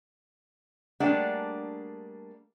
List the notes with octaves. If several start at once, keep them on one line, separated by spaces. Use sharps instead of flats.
G3 A3 A#3 D4 G#4 F#5